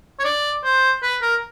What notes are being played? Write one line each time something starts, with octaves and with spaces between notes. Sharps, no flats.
C#5
D5
C5
B4
A#4